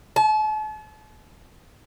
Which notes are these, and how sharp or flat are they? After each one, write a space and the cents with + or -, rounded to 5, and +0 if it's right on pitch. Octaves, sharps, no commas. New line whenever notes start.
A5 -40